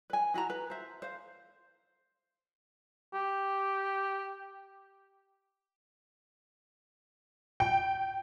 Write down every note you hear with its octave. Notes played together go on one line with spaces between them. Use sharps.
B4 G#5
E4 F#4 A5 A#5
B4
C5 E5
C5 F5
G4
G5